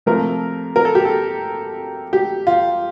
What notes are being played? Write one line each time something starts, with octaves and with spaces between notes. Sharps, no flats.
C3 F3 A3 A#4
A#4
A4
G4
A4
G4
F4